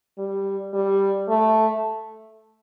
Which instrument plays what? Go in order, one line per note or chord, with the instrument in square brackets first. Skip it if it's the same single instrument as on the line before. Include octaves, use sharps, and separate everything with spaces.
[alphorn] G3
G3
A3